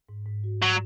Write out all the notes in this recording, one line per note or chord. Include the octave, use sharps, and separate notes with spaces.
G#2
G#2
F#4
F#3